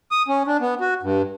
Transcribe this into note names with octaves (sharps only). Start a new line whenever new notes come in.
D#6
C#4
D4
B3
F#4
G2